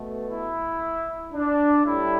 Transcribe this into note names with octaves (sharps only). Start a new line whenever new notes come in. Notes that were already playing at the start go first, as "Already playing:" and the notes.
Already playing: B2 A3
E4
D4
A2 G3 E4